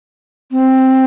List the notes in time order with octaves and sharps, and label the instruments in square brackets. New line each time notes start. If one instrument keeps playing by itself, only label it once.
[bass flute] C4